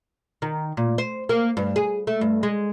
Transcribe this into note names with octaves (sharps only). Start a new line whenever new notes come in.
D#3
A#2
C5
A#3
G2
G#4
A3
G2
G#3